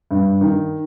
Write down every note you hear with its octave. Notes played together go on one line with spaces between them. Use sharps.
G2
D#3